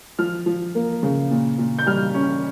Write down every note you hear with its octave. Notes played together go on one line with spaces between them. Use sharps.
F3 F6
F3
A#3
C#3
A#2
A#2
G6
G3 F6
C#4